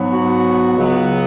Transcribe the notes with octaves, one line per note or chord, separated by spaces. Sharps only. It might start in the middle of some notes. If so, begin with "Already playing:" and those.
Already playing: G#2 F#3 B3
F#4
C#2 C#3 F#3 B3